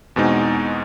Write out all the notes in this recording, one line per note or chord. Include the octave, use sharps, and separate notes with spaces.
E2 B2 G#3 C4 D#4